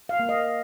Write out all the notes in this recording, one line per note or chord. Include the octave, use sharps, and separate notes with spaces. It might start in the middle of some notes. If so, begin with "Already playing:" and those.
F5
A#3
D#5